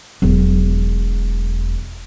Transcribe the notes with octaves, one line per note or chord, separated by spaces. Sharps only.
E1 F#3